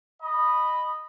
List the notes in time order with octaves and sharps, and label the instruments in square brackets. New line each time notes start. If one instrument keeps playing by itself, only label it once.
[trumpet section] D#5 B5